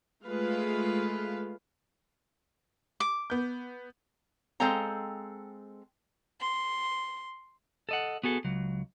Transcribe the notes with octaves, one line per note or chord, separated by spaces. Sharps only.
G#3 A3 F4 B4 F5
D6
B3 G6
G#3 C4 A4 F5 G5 A#5
C6
A4 D#5 F#5
B3 F#4 G#4 A4
C#2 F#3